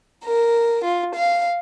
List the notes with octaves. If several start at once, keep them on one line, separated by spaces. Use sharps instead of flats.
A#4
F4
F5